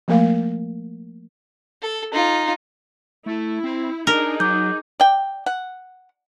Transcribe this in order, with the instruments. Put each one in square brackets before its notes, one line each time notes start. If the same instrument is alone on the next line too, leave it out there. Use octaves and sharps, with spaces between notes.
[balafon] F3 A3 A#3 A#4 F5
[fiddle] A4
D#4 F4
[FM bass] A3 [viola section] E4
[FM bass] C4
[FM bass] D4 [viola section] D#4 G#4 [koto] A#4
[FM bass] F#3 [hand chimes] D6 G6
[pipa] D5 G5
F#5